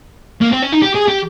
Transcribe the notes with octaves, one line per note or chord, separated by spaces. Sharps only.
A#3
C4
C#4
D#4
G4
G#4
G4